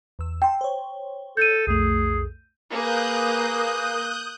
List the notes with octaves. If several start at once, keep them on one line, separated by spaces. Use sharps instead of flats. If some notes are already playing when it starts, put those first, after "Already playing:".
E2 E6
G5 A5 C6 E6
C5 C#5
A4 G6 D#7
B1 F2 A3 G#4
A#3 G#4 B4 D#6 F#6 G6